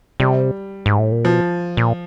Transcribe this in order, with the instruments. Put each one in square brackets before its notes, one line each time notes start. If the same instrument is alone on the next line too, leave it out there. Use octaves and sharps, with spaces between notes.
[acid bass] C3 [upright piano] G3
[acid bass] G#2
A2
A#2
[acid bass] B2 [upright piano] F3
[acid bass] A#2